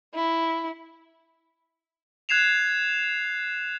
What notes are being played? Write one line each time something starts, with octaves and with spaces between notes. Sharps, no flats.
E4
F#6 G#6 C7 E7 F7